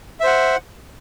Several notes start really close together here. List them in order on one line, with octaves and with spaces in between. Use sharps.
E5 C5 F#5